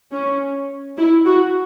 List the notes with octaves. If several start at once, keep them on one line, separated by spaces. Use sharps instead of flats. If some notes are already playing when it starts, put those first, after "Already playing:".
C#4
E4
F#4